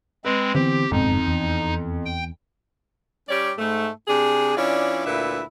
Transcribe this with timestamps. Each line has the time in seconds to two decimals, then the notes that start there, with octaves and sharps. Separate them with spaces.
0.25 G#3 C4 B4
0.55 D3 E3 B3 C4 G4
0.92 F#1 F2 G#2 B2 D#4
1.27 E2
2.06 G5
3.29 G3 C#4 G4 C#5 D5
3.57 G#2 A3
4.08 C3 D4 G#4
4.56 E3 C#4 D4 F4 D5
5.06 D2 A#2 E4 B4 E5